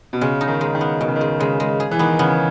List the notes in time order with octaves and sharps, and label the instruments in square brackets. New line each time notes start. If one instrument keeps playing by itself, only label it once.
[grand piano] B2
[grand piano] C#3 [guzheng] G#3
[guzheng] D#4
[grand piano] D#3
[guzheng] G#3
[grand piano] D#3
[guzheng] B3
[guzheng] B2 [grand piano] D#3
[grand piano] C#3
D#3
[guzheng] G#3
[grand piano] C#3 [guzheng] G#3
[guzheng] G#3
G#4
[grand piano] E3
[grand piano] D#3 [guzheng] B3
[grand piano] C#3 [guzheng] B3